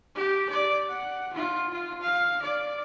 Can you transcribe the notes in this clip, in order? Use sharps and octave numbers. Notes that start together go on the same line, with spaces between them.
G4
D5
F#5
F4
F4
F5
D5